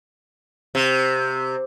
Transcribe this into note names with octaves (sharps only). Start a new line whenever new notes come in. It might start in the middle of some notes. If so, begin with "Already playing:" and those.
C3